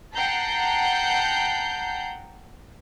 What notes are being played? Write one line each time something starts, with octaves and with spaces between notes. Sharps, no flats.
F#5 G5 A5 A#5 G6 C7